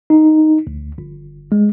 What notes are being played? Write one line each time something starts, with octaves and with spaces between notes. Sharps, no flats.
D#4
D2
G1
G#3